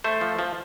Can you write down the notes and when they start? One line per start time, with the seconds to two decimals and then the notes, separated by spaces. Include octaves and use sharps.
0.04 A3 C5
0.21 F3
0.39 F3